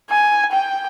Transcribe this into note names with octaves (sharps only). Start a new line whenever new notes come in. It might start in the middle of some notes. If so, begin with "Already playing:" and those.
G#5
G5